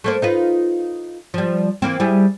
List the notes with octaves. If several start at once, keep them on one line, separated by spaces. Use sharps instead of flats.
A3 A#3 C5
D#4 F4 B4
F3 G3
E3 A#3 C4
G3 E4 G#4